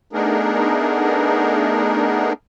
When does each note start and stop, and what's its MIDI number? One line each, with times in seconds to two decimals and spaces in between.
0.13 2.33 57
0.13 2.33 59
0.13 2.33 62
0.13 2.33 63
0.13 2.33 68
0.13 2.33 70